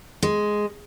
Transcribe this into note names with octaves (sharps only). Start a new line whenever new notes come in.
G#3